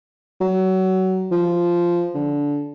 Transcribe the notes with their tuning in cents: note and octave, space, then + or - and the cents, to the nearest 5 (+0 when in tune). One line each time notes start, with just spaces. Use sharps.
F#3 +25
F3 -10
D3 -20